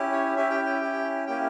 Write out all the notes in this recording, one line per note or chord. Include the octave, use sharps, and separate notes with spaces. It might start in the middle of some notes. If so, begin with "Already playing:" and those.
Already playing: C#4 E4 G4
C#5
C#4 E4 G4 E5
G5
G5
C#4 E4 G4
A#3 C#4 E4 G4 G5